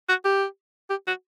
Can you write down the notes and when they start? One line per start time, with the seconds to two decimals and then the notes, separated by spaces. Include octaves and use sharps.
0.09 F#4
0.25 G4
0.90 G4
1.07 F#4